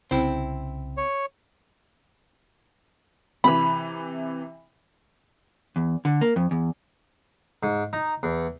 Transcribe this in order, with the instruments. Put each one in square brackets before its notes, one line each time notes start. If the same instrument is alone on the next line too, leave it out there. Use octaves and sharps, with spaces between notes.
[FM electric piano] C2 C#3 [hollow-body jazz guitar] C4 E4
[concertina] C#5
[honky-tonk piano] C3 E3 [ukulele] B5
[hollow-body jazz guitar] E2
D3
A#3
F2
E2
[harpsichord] G#2
D#4
E2